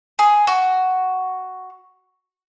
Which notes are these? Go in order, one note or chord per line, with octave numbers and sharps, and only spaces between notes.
G#4
F#4